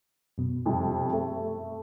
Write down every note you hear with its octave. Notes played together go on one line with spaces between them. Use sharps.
F#2 B2
F2 C3 G3
A3